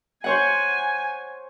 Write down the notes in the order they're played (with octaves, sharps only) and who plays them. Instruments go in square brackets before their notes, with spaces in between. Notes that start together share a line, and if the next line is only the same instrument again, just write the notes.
[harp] C5 C#5 F#5 [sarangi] G#5